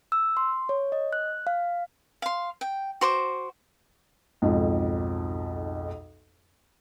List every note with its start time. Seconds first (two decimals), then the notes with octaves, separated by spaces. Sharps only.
0.12 E6
0.37 C6
0.69 C#5
0.92 D#5
1.13 F#6
1.47 F5
2.22 F5 C6
2.61 G5
3.01 F#4 C5 D6
4.42 B1 F2 G#2